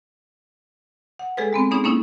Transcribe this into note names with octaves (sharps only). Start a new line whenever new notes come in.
F#5
G#3 G#4 A4 B4
G#3 B3 C4
B3 C#4 D#4 G#4
A#3 C#4 D#4 E4